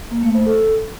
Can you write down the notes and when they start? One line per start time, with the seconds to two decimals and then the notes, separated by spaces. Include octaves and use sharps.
0.11 A#3
0.23 A3
0.35 C5
0.46 A4